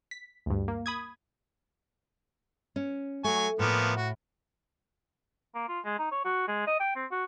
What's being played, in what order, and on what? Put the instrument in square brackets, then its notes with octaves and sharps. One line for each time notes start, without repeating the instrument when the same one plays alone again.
[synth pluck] B6
D2 G2
A#3
B5 D#6 G#6
[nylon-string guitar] C#4
[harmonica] F#3 G#5 C#6 [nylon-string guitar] A3
[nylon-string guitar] A2 [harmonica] F3 A#3 B3
[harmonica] F#4
[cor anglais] A#3
F4
G#3
D#4
C#5
F#4
G#3
D#5
G5
C4
F#4